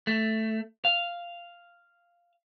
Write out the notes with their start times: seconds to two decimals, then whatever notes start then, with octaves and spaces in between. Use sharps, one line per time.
0.07 A3
0.85 F5